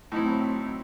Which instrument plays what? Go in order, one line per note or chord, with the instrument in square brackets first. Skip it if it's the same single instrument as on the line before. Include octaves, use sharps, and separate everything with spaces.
[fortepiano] A2 D#4 E4 [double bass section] F#3 C4